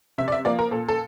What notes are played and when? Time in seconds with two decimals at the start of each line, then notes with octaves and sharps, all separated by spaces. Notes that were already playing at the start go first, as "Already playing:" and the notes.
0.18 C3 E5
0.28 D5
0.32 E5
0.45 F3 A#3 D5
0.59 A#4
0.71 A#2 A4
0.88 A4